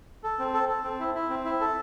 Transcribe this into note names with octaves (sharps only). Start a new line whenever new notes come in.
A4
C4
A4
A4
C4
E4
E4
C4
E4
A4